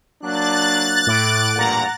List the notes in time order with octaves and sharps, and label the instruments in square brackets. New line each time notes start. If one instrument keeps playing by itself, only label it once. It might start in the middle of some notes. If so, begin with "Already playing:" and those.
[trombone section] F#3 A#3 D4 [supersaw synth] F#6 A6
[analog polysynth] A2 D6 D7
[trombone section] E2 G2 A#2 [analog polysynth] F#5 A#5